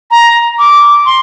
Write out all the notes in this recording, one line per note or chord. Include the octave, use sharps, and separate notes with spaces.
A#5
D6
C6